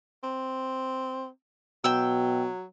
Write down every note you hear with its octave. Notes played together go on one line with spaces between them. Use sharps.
C4
B2 F#3 G5 E6